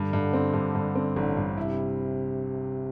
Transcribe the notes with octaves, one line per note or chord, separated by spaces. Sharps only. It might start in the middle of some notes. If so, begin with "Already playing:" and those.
Already playing: G2 D3
G2
C4
G2
G2
C4
A1
G2
C3 E4